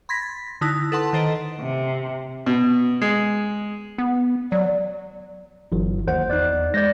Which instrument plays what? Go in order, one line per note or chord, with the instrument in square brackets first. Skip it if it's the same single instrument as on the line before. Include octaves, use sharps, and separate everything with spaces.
[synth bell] B5 C6 G#6 A#6 B6
A6
D3 D#4 E4 D#6 F#6
A4 B4 F#5 A5 C6
D#3 A4 C5 D#5 D7
[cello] C3
[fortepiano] B2
G#3
[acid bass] B3
[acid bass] F#3 [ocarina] D5
[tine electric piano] G1 E3 F#3
[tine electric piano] D#2 F#5 [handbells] C5
[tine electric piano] E2 D#4 [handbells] D5 F#6
[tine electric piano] G#3 [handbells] D5 G6 A#6